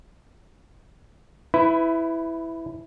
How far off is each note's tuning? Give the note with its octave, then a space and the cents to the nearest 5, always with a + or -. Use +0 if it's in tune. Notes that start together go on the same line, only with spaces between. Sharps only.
E4 +0 B4 +25